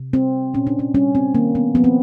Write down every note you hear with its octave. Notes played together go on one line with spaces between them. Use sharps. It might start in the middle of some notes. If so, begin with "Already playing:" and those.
Already playing: C3
G3 C4
A#2 C#4
D4
C#4
G3 C#4
C4
D#3 A#3
B3
F3 B3
C4